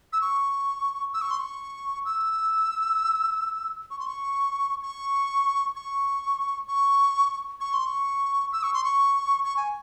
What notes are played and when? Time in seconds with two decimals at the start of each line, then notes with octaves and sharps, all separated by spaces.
0.13 E6
0.21 C#6
1.13 E6
1.22 C#6
1.31 C6
1.39 C#6
2.05 E6
3.91 C#6
3.99 C6
4.07 C#6
4.83 C#6
5.76 C#6
6.68 C#6
7.60 C#6
7.74 C6
7.86 C#6
8.53 E6
8.63 C#6
8.74 C6
8.84 C#6
9.45 C#6
9.57 G#5